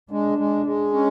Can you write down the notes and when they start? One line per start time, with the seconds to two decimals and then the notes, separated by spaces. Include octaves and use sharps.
0.11 G#3 D4
0.38 G#3
0.66 G#3
0.94 C#4